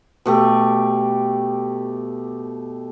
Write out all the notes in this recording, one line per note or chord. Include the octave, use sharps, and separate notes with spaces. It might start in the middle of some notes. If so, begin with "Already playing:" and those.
B2 A3 G4